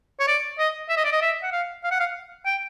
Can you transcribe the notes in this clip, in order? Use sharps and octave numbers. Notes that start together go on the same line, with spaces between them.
C#5
D5
D#5
E5
D#5
D5
D#5
E5
F#5
F5
F5
F#5
F5
G5